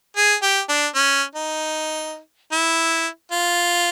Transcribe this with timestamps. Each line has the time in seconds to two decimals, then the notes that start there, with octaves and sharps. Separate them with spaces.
0.17 G#4
0.42 G4
0.69 D4
0.95 C#4
1.35 D#4
2.52 E4
3.32 F4